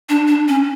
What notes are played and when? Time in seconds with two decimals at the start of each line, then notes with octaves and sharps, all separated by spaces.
0.09 D4
0.28 D4
0.48 C#4